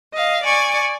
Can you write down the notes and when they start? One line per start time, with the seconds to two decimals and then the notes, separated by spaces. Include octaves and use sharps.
0.14 D#5 F5
0.44 D5 G#5 C#6